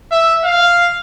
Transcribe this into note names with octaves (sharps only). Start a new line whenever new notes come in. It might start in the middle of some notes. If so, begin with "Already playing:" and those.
E5
F5